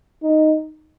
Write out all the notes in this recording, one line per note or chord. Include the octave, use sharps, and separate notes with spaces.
D#4